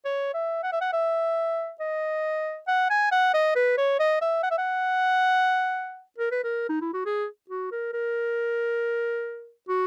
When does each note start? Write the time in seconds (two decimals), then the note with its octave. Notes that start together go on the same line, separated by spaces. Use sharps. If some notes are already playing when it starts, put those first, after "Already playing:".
0.05 C#5
0.34 E5
0.63 F#5
0.72 E5
0.81 F#5
0.93 E5
1.80 D#5
2.67 F#5
2.90 G#5
3.12 F#5
3.34 D#5
3.55 B4
3.78 C#5
3.99 D#5
4.21 E5
4.43 F#5
4.51 E5
4.58 F#5
6.18 A#4
6.31 B4
6.44 A#4
6.69 D#4
6.81 E4
6.94 F#4
7.06 G#4
7.50 F#4
7.72 A#4
7.93 A#4
9.68 F#4